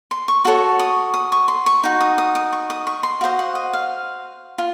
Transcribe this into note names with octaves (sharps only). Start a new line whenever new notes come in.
C6
C#6
F#4 A4 C#5 C#6
D#6
D#6
C#6
C6
C#6
D#4 F#4
D#6
D#6
D#6
C#6
D#6
C#6
C6
F#4 C5 D#5 F5
F#5
D#5
F5
F4